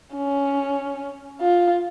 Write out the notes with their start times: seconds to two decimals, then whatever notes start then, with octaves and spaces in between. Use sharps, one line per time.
0.15 C#4
1.41 F4